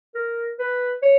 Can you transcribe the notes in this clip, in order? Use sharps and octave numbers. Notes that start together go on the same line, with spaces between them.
A#4
B4
C#5